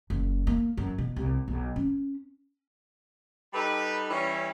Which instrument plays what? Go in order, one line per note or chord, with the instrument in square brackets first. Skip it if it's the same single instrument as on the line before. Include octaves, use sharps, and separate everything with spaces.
[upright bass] F#1
A#3
F#2
B2
C2
B1
C#4
[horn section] G3 D#4 A4 B4 B5
E3 G3 C#4